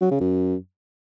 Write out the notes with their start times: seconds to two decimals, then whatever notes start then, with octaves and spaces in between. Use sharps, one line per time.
0.01 F#3
0.11 C#3
0.21 F#2